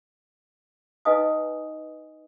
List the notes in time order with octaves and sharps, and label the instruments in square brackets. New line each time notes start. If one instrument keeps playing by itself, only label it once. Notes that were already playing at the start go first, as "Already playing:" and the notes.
[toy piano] D#4 B4 D#5 F5 G#5 D#6